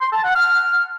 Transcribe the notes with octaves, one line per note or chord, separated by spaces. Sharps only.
C6
A5
F#5
F6